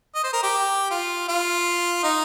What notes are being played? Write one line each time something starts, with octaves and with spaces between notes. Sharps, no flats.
D#5
C5
A#4
G4
F4
F4
D#4